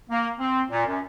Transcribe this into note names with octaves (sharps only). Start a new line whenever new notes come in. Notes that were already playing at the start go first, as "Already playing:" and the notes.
A#3
C4
A#2
F#2